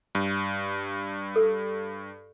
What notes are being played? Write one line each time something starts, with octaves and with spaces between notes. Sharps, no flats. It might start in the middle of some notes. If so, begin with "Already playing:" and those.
G2
A4